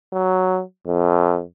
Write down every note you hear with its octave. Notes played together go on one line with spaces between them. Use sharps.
F#3
F2